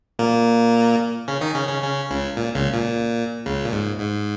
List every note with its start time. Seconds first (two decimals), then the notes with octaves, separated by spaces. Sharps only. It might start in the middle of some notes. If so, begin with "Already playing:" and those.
0.19 A#2 A#3
1.28 C#3 C#4
1.41 D#3 D#4
1.55 C#3 C#4
1.69 C#3 C#4
1.82 C#3 C#4
2.10 C#2 C#3
2.37 A#2
2.55 C#2 C#3
2.73 A#2
3.46 C#2 C#3
3.65 A#2
3.72 G#2
4.00 G#2